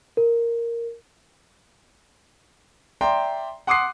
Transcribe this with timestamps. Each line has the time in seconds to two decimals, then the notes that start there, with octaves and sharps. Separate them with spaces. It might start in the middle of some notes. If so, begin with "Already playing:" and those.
0.17 A#4
3.01 D5 E5 G5 A#5 C6
3.67 F#5 C6 D6 D#6 F#6 C7